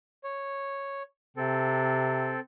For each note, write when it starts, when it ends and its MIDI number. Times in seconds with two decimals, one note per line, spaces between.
0.24 1.03 73
1.37 2.36 48
1.37 2.40 60
1.37 2.40 69